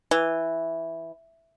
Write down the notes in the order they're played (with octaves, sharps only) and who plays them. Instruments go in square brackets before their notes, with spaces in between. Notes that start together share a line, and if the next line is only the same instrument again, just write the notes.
[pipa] E3